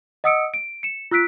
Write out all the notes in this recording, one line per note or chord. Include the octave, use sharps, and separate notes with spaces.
D#5 F#5 D#6 E6 C#7 D7
D7
C#7 E7
F4 E6 F#6 B6 D7